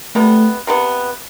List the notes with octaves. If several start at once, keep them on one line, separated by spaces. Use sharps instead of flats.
C3 G3 A3 B3
C3 G3 B3